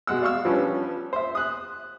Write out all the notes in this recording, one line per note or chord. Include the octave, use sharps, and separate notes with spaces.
B2 G#3 F#5 E6
D5 F5 C#6 E6
F3 G3 B3 C#4 D4
C5 E5
D#6 F#6